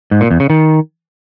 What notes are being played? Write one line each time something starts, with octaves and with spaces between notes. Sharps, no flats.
G#2
A#2
E2
C#3
D#3